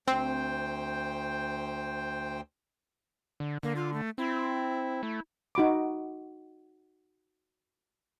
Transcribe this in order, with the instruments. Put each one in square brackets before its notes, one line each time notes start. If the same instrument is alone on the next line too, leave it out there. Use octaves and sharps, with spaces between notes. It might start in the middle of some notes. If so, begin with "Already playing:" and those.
[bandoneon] D2 C5 G5 [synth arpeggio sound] C4
[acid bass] D3
[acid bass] D3 [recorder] A#3
[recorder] F4
A3
[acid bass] C4 [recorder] E4
[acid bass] A3
[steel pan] D#4 F#4 B5 D6